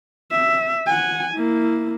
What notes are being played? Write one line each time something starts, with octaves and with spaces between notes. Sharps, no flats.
E5
F#5 G#5
A#3 E4